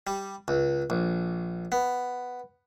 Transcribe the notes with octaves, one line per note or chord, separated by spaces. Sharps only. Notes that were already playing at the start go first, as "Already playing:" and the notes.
G3
C#2
A#1
B3